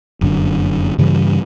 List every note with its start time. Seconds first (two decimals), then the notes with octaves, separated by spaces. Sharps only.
0.21 F1 F#2 D3
0.98 G2 C#3 E3 G3